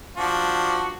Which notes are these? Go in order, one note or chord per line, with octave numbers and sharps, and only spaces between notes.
F3 D4 F#4